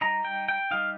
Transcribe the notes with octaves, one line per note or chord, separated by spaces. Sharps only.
G3 D#4 A#5
G5
G5
G3 D#4 F5